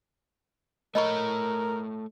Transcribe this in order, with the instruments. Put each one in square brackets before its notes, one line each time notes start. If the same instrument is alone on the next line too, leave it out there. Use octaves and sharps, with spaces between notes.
[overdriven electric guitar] A3 C#5 [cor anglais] A#4 [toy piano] D#5 B5 C#6